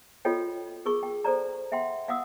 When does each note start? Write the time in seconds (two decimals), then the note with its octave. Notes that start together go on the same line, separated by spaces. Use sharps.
0.25 F4 F#4 A4 C#5 D#5 G5
0.86 G#4 A#4 C#6
1.03 G5
1.24 A4 C5 D5 A#5
1.72 E5 F#5 G5 C6
2.08 F5 F#5 D#6 E6